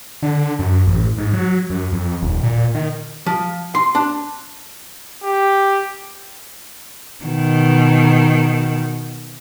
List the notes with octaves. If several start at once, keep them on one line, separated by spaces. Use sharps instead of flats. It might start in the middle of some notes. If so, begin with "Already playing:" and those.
D3
F#2
A1
G#2
F#3
F#2
F2
D#1
A#2
D#3
F3
C6
D4
G4
B2 D#3